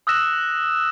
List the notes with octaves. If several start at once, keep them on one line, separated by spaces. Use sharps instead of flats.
D#6 E6 F#6 A#6 E7